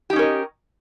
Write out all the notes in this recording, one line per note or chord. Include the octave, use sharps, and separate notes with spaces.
C#4 D#4 G4 A#4 D#5